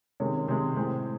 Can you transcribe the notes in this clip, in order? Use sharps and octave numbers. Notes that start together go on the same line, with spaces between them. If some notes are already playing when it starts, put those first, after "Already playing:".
C3 D#3 G#3 C#4
C3 D#3 G#3
A2 G#3 C4